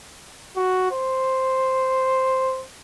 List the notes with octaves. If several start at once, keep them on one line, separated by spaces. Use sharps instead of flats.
F#4
C5